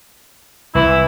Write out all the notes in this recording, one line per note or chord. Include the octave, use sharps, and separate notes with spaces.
C2 E3 E4